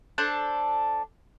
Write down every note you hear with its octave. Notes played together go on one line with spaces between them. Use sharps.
D4 A4 C5 F#6